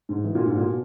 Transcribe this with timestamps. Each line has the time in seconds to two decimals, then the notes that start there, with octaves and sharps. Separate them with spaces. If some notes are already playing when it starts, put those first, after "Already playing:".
0.09 G#2
0.24 E3
0.35 A#2
0.46 G#2
0.57 A#2
0.68 B2